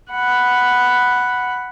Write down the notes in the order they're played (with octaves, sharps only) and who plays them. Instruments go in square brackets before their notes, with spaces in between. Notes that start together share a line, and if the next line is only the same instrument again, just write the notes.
[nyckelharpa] F#5 B5